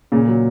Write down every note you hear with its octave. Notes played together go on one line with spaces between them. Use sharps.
A#2 C#3
F#3